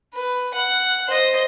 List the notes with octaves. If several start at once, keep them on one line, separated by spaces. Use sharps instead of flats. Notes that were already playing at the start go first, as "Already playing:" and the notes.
B4
F#5
C5 D#5